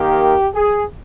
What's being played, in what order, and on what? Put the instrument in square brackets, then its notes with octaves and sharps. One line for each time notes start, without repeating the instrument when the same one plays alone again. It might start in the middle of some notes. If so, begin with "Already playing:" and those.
Already playing: [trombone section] D#3 A#3 G4
G#4